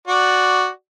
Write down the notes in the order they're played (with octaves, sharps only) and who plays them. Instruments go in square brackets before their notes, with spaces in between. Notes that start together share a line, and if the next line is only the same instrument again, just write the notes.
[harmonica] F#4 D5